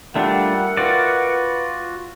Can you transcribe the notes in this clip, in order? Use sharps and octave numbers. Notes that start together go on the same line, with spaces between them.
G3 A3 D4 F4 A#4 E5 F#5
F4 F#4 B4 D5